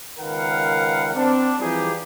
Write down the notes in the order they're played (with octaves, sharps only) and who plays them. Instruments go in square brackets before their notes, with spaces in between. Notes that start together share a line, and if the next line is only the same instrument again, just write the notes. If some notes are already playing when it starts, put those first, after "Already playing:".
[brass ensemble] C#2 D#3 A#4 B4 F5 F#5
C4 D4
E3 F3 G3 D#4 G4 G#4